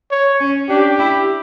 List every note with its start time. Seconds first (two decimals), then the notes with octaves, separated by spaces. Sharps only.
0.11 C#5
0.40 C#4
0.69 D4 G4
0.99 E4